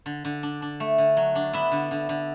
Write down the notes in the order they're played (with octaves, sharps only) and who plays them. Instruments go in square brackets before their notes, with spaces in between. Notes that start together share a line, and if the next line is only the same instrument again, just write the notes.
[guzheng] D3
D3
D4
D4
A3
D3
F#3
D4
B3 E4 E5
D3
D3
D3